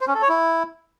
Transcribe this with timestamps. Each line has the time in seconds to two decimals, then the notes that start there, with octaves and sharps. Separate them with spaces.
0.01 C5
0.08 C#4
0.15 A4
0.22 C#5
0.29 E4